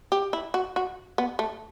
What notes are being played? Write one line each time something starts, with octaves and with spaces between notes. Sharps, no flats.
G4
E4
F#4
F#4
B3
A3